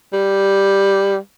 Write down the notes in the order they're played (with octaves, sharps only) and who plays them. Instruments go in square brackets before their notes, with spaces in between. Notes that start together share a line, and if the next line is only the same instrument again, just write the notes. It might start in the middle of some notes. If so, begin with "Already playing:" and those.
[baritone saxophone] G3